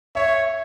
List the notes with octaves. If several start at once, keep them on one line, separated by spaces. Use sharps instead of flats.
C#5 E5